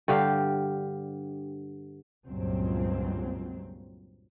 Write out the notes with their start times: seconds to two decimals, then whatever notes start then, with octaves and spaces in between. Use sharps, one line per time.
0.08 G2 D3 G4 F5
2.27 C#2 G2 A#2 F#3 C4